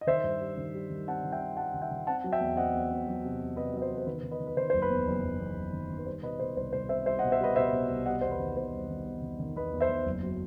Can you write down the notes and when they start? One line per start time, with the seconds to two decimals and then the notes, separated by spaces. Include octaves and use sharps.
0.01 D#5
0.07 D#3 C5 E5
0.24 G2
0.41 G3
0.57 D#3
0.74 G3
0.90 D#3
1.08 C4 F#5 A5
1.24 D#3
1.33 E5 G5
1.40 C4
1.57 G3 F#5 A5
1.74 D#3
1.82 E5 G5
1.91 D#3
2.07 C4 F#5 A5
2.24 F#3
2.32 E5 G5
2.41 E2
2.57 C4 D#5 F#5
2.74 E2
2.91 C4
3.08 F#3
3.24 C3
3.41 E2
3.56 C3 B4 D#5
3.73 F#3 D#5
3.82 C5
3.90 E2
3.98 C5
4.07 D#3 B4
4.23 D#3
4.31 B4 D#5
4.40 D#3
4.47 B4
4.57 D#3 C5
4.70 F#1 C5
4.82 B4
4.90 E2
5.07 F#1
5.24 F#1
5.39 E2
5.56 F#1
5.73 D#3
5.90 D#3
5.98 B4
6.06 G3 C5
6.23 B2 B4 D#5
6.40 B2 C5
6.56 C2 C5
6.73 C2 C5
6.89 C4 C5 E5
7.06 G3 C5 E5
7.19 D#5 F#5
7.24 B2
7.32 C5 E5
7.40 G3 B4 D#5
7.56 B2 C5 E5
7.72 B2
7.89 C2
8.06 G3 D#5 F#5
8.21 E2 C5
8.31 B4
8.39 D#3
8.57 E2 C5
8.73 G3
8.89 D#3
9.06 E2
9.22 D#3
9.40 D#3
9.56 E2 B4 D#5
9.73 E2
9.81 C5 E5
9.89 E2
10.06 F#1
10.23 F#3